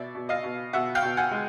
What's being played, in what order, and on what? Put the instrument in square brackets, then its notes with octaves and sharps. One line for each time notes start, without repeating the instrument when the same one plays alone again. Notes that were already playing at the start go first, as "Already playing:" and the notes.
Already playing: [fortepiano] B2 D5 E5
B2
D#5 F5
B2
B2 E5 F#5
F5 G5
B2
F#5 G#5
G#3